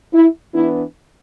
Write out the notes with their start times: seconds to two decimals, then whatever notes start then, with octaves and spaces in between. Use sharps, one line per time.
0.12 E4
0.53 E3 B3 D4 E4